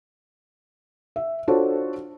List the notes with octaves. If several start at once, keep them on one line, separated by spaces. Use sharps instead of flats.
E5
D4 F4 F#4 A4 C5 C#5